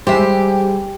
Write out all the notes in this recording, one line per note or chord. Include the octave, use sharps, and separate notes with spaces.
G3 G#3 G4 C5 E5